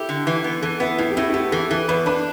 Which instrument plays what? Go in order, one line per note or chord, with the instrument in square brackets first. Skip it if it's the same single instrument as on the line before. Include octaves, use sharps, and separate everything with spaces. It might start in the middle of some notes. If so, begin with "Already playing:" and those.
Already playing: [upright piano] E4 A4 [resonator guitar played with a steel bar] G4
[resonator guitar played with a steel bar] D3
E3
B3
[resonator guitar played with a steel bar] E3 [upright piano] A4
[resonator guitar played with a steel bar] B3 [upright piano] E4
[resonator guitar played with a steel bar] A2 [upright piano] E4
[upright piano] G4
[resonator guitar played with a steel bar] A2 [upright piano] E4
[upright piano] E4
[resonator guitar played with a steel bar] B3 [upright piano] G4
[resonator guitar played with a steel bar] E3 [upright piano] A4
[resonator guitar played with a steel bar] E3 [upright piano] A4
[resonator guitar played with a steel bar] E2 [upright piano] B4
[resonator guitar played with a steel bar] D4 [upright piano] B4